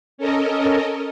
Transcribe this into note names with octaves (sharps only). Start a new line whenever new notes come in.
C#4 A4 A#4 D#5